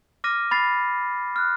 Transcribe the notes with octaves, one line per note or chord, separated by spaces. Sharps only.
D6 F6 A#6 D#7
B5 A6 C7
F6 F#6